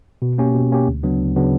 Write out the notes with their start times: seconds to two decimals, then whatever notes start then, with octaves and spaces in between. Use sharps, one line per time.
0.22 B2
0.38 A#3 C#4 G4
0.54 B2
0.72 A#3 C#4 G4
0.88 D2
1.03 C#3 F#3 B3 D4
1.19 D2
1.36 C#3 F#3 B3 D4